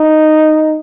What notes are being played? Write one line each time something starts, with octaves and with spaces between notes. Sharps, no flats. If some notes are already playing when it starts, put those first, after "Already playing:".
Already playing: D#4